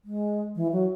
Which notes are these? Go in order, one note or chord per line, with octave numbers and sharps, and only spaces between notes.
G#3
E3
F#3